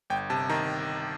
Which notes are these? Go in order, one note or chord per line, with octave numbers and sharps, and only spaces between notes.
G1 G5
C3 A5
D#3 A#5